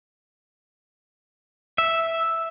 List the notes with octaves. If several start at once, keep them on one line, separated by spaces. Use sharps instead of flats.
E5